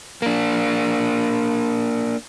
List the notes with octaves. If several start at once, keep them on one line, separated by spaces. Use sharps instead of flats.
A#3 D4